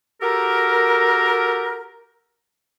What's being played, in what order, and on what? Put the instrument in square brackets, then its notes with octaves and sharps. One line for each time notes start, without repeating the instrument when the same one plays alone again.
[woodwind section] F#4 G4 A4 A#4